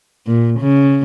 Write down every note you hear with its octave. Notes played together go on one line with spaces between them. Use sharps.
A#2
C#3